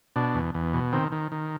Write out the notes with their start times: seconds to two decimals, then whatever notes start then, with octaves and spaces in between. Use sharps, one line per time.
0.16 B2 D4
0.35 E2
0.54 E2
0.73 B2
0.93 D#3 C4
1.12 D#3
1.32 D#3